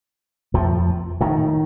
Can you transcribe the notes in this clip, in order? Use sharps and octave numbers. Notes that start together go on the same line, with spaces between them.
F2 A2 F3
A2 D#3